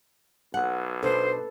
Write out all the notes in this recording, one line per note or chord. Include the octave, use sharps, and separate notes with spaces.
B1 F#5
B2 D4 A4 B4 C5